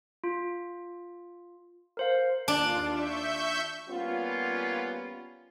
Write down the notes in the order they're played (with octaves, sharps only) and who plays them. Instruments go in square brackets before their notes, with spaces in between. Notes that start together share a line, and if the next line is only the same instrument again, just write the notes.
[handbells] F4
A#4 C5 F5
[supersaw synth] D#2 F4 [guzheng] D4
[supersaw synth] E5 C#6 G6
[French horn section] G3 A#3 B3 C#4 F4